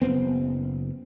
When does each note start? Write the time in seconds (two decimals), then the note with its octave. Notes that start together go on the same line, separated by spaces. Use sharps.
0.02 F#1 A#2 B3 C4